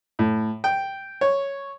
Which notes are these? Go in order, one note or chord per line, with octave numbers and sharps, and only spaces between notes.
A2
G5
C#5